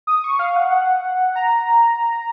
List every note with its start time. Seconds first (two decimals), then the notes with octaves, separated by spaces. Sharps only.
0.07 D#6
0.24 C#6
0.39 F5
0.56 F#5
0.71 F#5
1.36 A#5